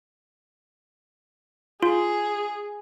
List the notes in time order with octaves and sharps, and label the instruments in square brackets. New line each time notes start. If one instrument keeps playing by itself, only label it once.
[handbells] F4 [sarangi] G#4